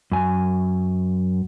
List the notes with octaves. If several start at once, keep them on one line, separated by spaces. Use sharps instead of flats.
F#2 G#5